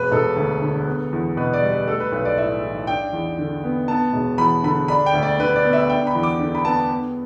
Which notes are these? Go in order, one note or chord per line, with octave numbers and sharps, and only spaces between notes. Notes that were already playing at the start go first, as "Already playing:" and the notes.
Already playing: E1 B4
E1 A4
D2
D3
B3
E2
B2 B4
D5
G3
B4
A3 A4
B4
B1 B4
D5
A2 E5
E3
D4 G5
E2
D3
B3
B3 A5
E1
E2 B5
D3 B5
D4 B5
G5
D2
D5
D3 B4
D5
B3
E5
D4 G5
B5
E2
D6
D3
B5
B3 A5
B3